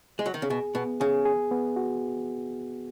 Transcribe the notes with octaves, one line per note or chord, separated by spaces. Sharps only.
G#3
F#3
D#3
C#3
B2 G#4
B2 B3
C#3 G#4
G#4
B3
F#4